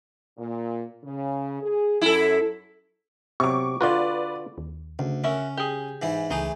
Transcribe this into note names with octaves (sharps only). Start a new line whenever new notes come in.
A#2
C#3
G#4
F#2 E4 A4
C3 F#3 C#6 D6
D3 F4 F#4 B4 D5
D#2
D2 C#3
C#4 F#4 A#4 E5
G4 G#4
G#2 E3 E4
C#2 E3 A3 D#4 G#4